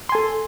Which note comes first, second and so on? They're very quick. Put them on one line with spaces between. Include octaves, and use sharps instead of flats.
C6 G#5 A4